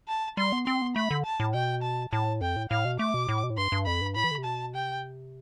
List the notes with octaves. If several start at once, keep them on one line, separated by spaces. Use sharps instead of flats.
A5
G3 C6
B3
C4 C6
B3
A3 B5
D3
A5
A2
B2 G5
A5
A2 A5
F2 G5
A2
A2 F5
B2
A3 D6
B2
A2
B2
A2
G2 C6
G2
F2 B5
G2
A2 B5
E3
D3
C3
B2 A5
C3 G5